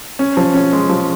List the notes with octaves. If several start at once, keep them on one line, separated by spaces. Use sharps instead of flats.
C#4
F3
C#4
G#3
F3